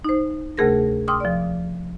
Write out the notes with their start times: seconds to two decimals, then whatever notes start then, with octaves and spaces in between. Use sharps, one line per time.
0.04 D#4 C5
0.57 D2 C3 A3 G#4 A#4 A#6
1.08 G5 C6 D6 D#6 F6
1.20 F3 D5